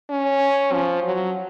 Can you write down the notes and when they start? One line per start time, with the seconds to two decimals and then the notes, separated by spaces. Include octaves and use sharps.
0.10 C#4
0.73 F3
1.03 F#3